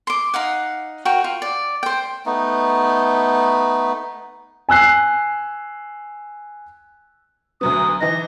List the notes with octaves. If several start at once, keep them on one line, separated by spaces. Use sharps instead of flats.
C6 D6
D#4 F5 F#5
F#4 A#4 G5
F4
D5
C5 G5
A3 B3 D#4
G#5 E6 F#6 C7
D2 F#3 B3 D#6
E3 D#4 A#6